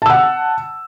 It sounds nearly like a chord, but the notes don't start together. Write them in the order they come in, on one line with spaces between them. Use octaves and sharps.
A5 E6 F#5